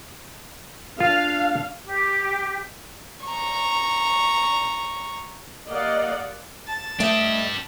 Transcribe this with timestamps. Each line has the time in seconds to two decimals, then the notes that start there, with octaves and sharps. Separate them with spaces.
1.00 D4 F4 F5
1.85 G4
3.26 A#5 C#6
5.68 A#3 G4 D5 D#5 F5 F#5
6.67 A5
7.00 A3 D4 G4 D#5 E5